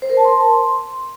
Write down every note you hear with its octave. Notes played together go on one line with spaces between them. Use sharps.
C5
A#4
A5
C6